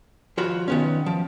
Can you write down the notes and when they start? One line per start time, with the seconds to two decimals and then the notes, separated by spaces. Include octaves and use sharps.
0.37 F3 F4 F#4 D#5 B5
0.68 D#3 B3 C#4
1.06 F3